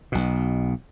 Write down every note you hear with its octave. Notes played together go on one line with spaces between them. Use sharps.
B1 B2